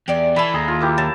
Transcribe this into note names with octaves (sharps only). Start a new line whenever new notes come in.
E2 G4 D5
E3 A3 E4 A5 B5
D#2 G#4 A#5
F4
A#3 E4 G4
F#3 A5